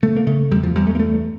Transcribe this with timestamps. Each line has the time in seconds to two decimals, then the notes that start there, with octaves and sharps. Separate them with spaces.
0.02 C#3 A3
0.16 A#3
0.27 C#3 A3
0.51 E2 G3
0.63 F3
0.75 E2 G3
0.87 A3
0.95 A#3
1.00 G2 A3